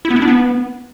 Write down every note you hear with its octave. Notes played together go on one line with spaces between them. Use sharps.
E4
B3
E4
D4
B3